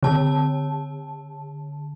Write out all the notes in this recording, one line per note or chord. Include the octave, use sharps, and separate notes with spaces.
D3 A5